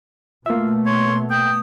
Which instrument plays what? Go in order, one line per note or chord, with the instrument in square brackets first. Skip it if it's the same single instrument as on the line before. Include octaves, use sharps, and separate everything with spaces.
[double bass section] B2 A3 [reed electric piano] A#3 E5 [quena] F4
[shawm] C#5 [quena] C6
[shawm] G5 [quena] D#6